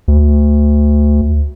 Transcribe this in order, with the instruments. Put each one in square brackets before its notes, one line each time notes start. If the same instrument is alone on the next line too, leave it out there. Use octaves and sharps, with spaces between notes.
[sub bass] D2